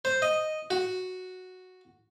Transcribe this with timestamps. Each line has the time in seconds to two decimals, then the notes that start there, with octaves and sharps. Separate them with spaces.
0.05 C5
0.22 D#5
0.71 F#4